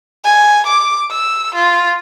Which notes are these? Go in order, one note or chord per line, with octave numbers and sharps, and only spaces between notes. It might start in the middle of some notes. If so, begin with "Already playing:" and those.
G#5
D6
E6
F4